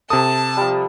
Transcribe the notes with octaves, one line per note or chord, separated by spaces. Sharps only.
C3 A4 A5 D#6
F3 G3